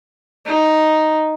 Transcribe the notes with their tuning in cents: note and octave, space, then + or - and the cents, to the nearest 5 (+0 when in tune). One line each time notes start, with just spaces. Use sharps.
D#4 +0